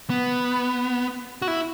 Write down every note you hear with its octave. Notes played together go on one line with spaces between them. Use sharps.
B3
F#4
E4